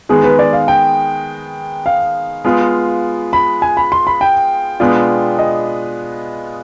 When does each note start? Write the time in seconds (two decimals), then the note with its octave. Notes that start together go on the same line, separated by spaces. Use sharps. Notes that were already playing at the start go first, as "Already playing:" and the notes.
0.09 D#3 G#3 B3 G#4
0.24 B4
0.39 D5
0.53 F5
0.68 G5
1.86 F5
2.45 G#3 B3 F4 G#4
3.33 B5
3.62 G#5
3.77 B5
3.92 C6
4.07 B5
4.21 G5
4.80 B2 G#3 B3 D4 F4
5.39 D#5